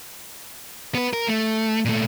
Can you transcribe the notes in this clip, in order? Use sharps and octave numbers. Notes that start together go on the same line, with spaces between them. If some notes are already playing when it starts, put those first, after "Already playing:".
B3 B4
A#4
A3
A#2 A3